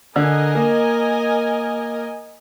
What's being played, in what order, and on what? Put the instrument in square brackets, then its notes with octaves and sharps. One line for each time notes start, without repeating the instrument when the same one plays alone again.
[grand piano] D3 [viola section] A#4 D#5 G#5
[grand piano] A#3